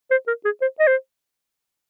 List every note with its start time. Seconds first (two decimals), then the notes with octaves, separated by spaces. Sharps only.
0.11 C5
0.28 A#4
0.45 G#4
0.62 C5
0.80 D#5
0.87 C5